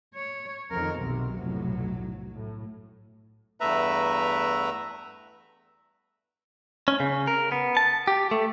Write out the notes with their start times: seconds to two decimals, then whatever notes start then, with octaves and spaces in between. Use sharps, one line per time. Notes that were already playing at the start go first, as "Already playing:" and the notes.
0.15 C#5
0.71 F2 D#3 A#4
1.00 B1 C3 F#3
1.35 F1 B1 A2
2.36 A2
3.60 E2 G2 A3 B4 E5 A#5
6.88 C#4
7.00 C#3
7.27 A#4
7.52 B3
7.77 A5
8.08 G4
8.31 A3